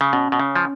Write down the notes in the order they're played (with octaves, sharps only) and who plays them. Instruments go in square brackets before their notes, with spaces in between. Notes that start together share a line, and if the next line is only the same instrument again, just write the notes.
[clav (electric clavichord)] C#3
[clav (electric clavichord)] B2 [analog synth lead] C#4
[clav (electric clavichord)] B2
C#3
F3